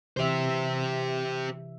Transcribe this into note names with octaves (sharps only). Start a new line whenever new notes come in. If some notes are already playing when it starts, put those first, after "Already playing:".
C3 E3 G4 C5 E5